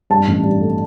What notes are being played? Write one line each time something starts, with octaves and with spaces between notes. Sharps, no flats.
G2 A5
A1
G2
A3